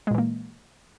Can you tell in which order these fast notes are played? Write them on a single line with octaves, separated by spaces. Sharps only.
G#3 A#2 E3 A#3